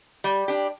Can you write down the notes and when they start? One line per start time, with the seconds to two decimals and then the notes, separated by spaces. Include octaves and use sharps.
0.24 G3
0.48 D4 G4